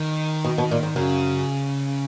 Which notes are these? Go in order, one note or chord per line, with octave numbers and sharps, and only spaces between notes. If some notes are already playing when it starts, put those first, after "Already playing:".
Already playing: D#3
B2
B2
A#2
G#2
F#2 C#3